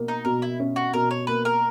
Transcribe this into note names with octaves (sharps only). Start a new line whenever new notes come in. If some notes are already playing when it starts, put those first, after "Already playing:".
Already playing: B2 A#3
D#4
B2 A#4
E4
C#4
F#4
B2 A#4
C#5
A#3 B4
A#4